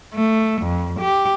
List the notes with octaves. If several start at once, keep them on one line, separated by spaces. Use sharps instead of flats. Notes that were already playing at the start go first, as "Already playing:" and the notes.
A3
F2
G4